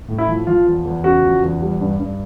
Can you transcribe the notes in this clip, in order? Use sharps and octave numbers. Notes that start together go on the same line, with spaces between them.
A2
E4
F3
F3 F4
E2
E2
C#3 F#4
F3
E2
G3
G2
G2